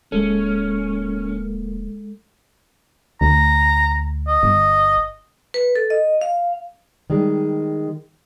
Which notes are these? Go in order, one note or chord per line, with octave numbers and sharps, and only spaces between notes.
D1 G#3 A#3 C#4 A4
D2 A#5
D#5
G1
B4
A4
D#5
F5
D#3 G3 G#3